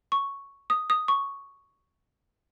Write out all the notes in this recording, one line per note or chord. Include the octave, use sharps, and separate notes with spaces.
C#6
D#6
D#6
C#6